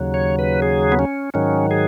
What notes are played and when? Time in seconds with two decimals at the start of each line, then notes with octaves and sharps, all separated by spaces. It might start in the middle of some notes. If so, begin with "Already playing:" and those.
Already playing: D#2 C#3 F#3
0.14 C#5
0.39 B4
0.62 G#4
0.92 B3
0.99 C#4
1.34 G#2 D#3 F#3 C#4
1.71 G#4